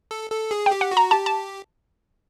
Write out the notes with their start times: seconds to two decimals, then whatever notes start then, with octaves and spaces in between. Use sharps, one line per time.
0.11 A4
0.31 A4
0.51 G#4
0.66 G5
0.71 G4
0.81 F#5
0.91 F#4
0.97 A#5
1.11 G4 A5
1.26 A5